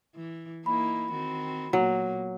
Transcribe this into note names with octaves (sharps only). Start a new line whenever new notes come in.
E3
A#3 D#4 E4 B5
D#3 C4 F#4
A#2 F#3 A#3 B3